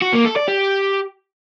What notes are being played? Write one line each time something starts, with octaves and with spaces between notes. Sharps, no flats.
F#4
A#3
A4
D5
G4